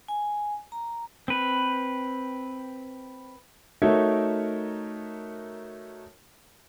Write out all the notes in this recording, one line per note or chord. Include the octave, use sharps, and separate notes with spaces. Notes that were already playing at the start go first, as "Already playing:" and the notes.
G#5
A#5
C4 B4
A3 D#4 F#4 A#4 C#5 E5